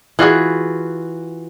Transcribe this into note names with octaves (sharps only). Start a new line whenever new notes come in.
E3 F4 F#4 G#4